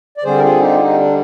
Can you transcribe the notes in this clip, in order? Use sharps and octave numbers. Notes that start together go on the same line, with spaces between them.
D5
D3 G3 C4 G#4 C5
A#4
F4 G#4
D#4 G4
F4
C4 D#4
D4